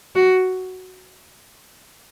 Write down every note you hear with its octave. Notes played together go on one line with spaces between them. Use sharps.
F#4